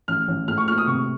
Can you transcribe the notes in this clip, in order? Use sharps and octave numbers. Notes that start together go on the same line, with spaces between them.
A1 F6
A1
A2 F6
C#6
A#1 F6
D#6
C3 C#6